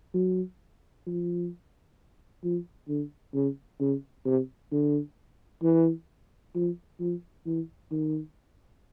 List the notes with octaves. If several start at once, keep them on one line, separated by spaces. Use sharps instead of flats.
F#3
F3
F3
D3
C#3
C#3
C3
D3
E3
F3
F3
E3
D#3